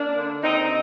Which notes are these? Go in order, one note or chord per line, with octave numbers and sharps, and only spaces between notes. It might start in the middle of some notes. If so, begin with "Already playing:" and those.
Already playing: A#3 D4
D3
D#2 C4 D#4
D#4